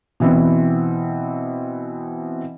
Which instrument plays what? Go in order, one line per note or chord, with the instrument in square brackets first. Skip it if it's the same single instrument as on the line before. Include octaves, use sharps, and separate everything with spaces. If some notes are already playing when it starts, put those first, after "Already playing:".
[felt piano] B2 E3 B3 C4